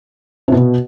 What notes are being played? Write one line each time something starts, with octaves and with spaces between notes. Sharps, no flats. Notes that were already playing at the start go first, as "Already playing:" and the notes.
C3
B2